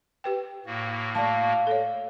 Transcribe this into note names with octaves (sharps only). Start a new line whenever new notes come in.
G4 B4 G5
A2 A#3 F#4
A3 D5 F5 A5
A4 C#5